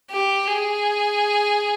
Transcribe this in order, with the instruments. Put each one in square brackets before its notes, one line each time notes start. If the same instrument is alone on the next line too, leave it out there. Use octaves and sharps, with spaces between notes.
[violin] G4
G#4